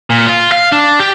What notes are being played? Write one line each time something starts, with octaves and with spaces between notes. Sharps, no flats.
A#2
F4
F5
D4
G4